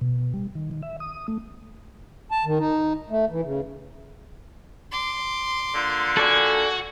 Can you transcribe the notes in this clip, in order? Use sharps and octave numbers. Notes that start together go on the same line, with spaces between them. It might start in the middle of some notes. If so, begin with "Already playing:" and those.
B2
G3
D#3
D#3
E5
D#6
A3
A5
D#3
D#4
A3
E3
C#3
C6 D6
A#2 D3
F#4 A4 D5 G#5